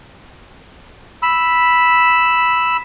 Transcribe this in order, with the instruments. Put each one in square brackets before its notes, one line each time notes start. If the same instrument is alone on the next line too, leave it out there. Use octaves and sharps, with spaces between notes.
[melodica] B5 E6